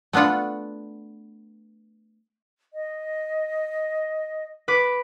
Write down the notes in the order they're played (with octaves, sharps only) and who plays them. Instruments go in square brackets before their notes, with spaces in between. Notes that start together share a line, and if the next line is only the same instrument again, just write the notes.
[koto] A3 B3 D4 F4 F#5
[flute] D#5
[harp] B4 D6 B6